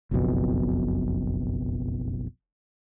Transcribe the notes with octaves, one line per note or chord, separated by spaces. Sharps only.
F#1 B1 F2 B2